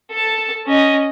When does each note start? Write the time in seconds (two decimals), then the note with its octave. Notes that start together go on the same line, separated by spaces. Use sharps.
0.10 A4 A5
0.67 C#4 D#5